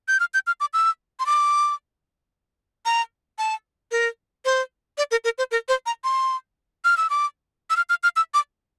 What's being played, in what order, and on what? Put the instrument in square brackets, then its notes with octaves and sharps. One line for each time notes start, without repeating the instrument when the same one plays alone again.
[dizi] G6
F6
G6
F6
D6
E6
C6
D6
A#5
A5
A#4
C5
D5
A#4
A#4
C5
A#4
C5
A#5
C6
F6
E6
D6
E6
F6
F6
F6
E6
D6